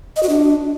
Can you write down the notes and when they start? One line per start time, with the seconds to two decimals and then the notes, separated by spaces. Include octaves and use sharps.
0.16 D#5
0.23 F#4
0.29 D4